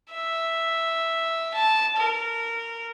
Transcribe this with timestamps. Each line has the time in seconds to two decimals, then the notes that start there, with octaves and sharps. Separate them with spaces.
0.12 E5
1.55 A5
1.97 A#4